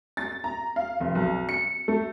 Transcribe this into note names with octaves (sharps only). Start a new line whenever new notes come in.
A6
A#5
F5
F1
B1
C#7
A3